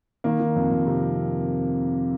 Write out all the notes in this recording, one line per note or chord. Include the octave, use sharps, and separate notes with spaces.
D#3 A#3
D#3
F2
F2
C3